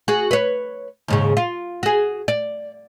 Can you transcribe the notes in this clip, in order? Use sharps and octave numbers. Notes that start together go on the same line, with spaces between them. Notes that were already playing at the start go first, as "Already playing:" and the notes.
F#4 G#4
B4 C#5
D#2 G#2 C#3
F4
F#4 G#4
D5